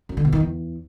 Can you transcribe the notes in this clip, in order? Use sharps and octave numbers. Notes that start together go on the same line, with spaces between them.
F#2
D3
B2
D#3
E2